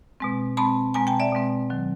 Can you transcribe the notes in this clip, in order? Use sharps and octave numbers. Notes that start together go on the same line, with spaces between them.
B2 G#3 C4
B2 G#3 C4 A5 B5
B2 G#3 C4 G#5 A#5
G5 A5
D5 E5
B2 G#3 C4
D#3 F#3